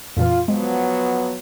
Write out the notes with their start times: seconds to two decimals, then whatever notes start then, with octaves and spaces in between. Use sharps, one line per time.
0.17 F2 A#2 E3 F4
0.48 F3 F#3 G#3 B3